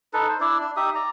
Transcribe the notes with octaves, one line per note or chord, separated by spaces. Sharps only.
D#4 A4 B4
C5
D4 E4 D5
D4
D#4 G4 E5 D#6
D5 A#5